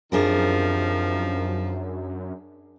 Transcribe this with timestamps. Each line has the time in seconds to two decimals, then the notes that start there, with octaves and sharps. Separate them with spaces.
0.12 F#2 C3 D#3 F3 D4 G#4 A#4